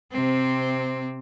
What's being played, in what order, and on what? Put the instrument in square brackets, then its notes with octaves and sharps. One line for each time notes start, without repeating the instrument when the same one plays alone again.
[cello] C3 C4